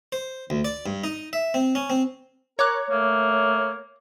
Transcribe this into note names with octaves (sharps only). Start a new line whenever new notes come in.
C5
D2
D5
G2
D#4
E5
C4
C#4
C4
A#4 C#5 A#5 D6 F#6
A3 A#3